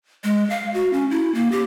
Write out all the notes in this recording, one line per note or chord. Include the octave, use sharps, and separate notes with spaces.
G#3
F5
F#4
C#4
E4
A#3
G4